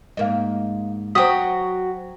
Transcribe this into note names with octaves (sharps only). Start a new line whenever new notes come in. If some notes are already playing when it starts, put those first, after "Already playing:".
G#2 A#3 D#5 F5
F#3 F#4 C5 G5 D#6 B6